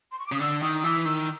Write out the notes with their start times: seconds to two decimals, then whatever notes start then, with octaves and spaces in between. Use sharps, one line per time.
0.11 C6
0.19 C#6
0.26 D6
0.32 C#3 D#6
0.40 D3 E6
0.62 D#3 D#6
0.83 E3 E6
1.05 D#3 E6